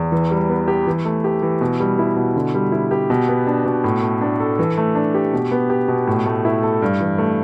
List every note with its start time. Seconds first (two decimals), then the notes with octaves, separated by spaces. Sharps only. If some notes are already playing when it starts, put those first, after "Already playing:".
Already playing: E2
0.12 E3
0.31 G3
0.49 B3
0.68 G4
0.87 E3
1.05 A3
1.24 G4
1.43 E3
1.61 B2
1.80 G3
1.99 E4
2.16 B2
2.36 D3
2.54 G3
2.72 E4
2.91 G4
3.10 B2
3.28 B3
3.47 D4
3.65 B2
3.84 A2
4.02 A3
4.21 D4
4.40 A4
4.59 E3
4.77 A3
4.95 D4
5.14 G4
5.33 B2
5.51 B3
5.70 G4
5.88 B2
6.07 A2
6.26 A3
6.45 E4
6.63 A4
6.82 G2
7.00 E3
7.18 A3